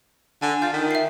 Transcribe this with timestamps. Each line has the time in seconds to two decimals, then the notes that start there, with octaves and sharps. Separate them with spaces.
0.42 D3 G#5
0.62 F4 G6 A6
0.73 D#3
0.91 E5 C7